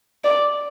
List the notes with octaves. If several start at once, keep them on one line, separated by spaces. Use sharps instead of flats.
D5